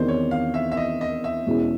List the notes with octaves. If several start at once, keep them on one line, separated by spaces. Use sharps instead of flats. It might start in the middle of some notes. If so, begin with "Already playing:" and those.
Already playing: E2 C3 D#3 C5 D5
C#5
F5
E5
E5
D#5
D#5
E5
E2 B2 G#3 C#4 E4